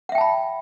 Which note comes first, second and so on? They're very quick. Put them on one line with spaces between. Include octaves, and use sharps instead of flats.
F#5 E5 G5 A5 B5